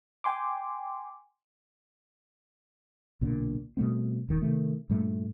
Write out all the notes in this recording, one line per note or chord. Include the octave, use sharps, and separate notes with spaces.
G5 G#5 C6 D6
B1 A#2 D3
B2 G3 A3 C4
E1 D#3
C3 D#3 A3
G2 A#2 G3 A3